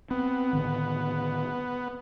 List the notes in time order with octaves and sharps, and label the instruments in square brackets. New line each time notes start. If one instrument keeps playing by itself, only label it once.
[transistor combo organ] B3 [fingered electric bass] C4
[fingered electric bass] A2 D3 D#3